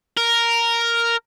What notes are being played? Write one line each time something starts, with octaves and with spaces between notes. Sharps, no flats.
A#4